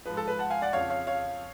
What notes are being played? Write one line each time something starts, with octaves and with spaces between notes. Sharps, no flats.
G#2 F3 B4
A4
B4
F#5 A5
F5 G#5
D5 F#5
F2 C#3 F3 C#5 F5
C#5 F5
C#5 F5